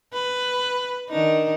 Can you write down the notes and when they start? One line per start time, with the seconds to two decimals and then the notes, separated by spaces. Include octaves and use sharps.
0.13 B4
1.10 D#3 D4 D#4